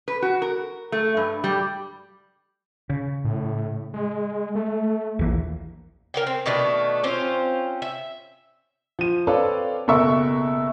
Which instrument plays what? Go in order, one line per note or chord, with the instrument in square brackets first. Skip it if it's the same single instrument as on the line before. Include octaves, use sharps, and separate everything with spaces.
[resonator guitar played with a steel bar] B4
F#4
A#4
A3
G2
G3
[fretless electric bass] C#3
[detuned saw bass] A2
G#3
A3
[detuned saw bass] A#1 [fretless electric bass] D#2 E3 A#3
[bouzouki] C#4 A#4 F#5 G5
C4
B2 D#3 A3 D4
C4 C#4 F4 C5
E5
[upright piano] F3 D#7
C4 A4 B4 C#5 D5 F5
F#1 B2 A4 A#4 E5 C#6